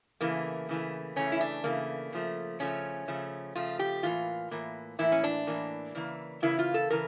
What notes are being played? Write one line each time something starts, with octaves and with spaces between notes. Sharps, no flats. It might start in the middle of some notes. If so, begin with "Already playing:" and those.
C#3 E3 A3 A#3
C#3 E3 A3
C#3 E3 A3 C#4
E4
D4
C#3 E3 A3 A#3
C#3 F3 A3
C#3 F3 A3 C#4
C#3 F3 A3
C#3 F3 A3 F4
G4
A2 E3 A#3 F4
A2 E3 A#3
A2 E3 A#3 E4
C#4
D4
A2 E3 A#3
C#3 E3 A#3
C#3 E3 A#3 E4
F4
A4
C#3 E3 A#4